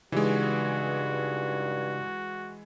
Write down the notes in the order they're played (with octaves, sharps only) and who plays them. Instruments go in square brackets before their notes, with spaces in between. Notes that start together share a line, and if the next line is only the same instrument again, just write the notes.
[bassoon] G2 [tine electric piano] C#3 D#4 G4 [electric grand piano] E3 G#3 [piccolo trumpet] F#4